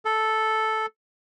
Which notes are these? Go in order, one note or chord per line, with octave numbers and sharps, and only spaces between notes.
A4